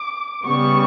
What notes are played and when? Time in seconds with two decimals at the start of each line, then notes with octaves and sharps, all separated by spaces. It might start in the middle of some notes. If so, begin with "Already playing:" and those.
Already playing: D6
0.45 C#3 G3 B3 C#6